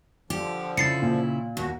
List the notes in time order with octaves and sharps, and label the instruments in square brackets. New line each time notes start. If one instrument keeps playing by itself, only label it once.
[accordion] D3 F3 [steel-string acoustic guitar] G4
[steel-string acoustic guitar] C#3 E4 [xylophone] A6 C7 C#7
[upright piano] A#2
[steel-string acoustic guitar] D#2 [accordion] F#4